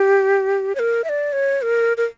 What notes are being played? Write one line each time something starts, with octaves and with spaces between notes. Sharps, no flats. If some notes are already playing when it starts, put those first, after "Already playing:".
Already playing: G4
C#5
A#4
E5
D5
C#5
A#4
A#4